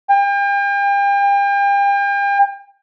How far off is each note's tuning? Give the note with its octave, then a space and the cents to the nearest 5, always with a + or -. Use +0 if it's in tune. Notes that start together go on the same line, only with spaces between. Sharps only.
G5 +40